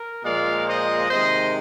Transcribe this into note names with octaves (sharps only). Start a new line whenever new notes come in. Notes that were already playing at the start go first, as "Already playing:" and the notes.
Already playing: A#4
A#2 F3 G#3 D5 F5
C5 D#5
C3 D#3 G#3 C5 D#5